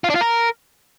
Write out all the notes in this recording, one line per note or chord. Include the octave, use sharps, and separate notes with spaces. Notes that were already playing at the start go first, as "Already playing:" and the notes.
F4
D4
F4
A#4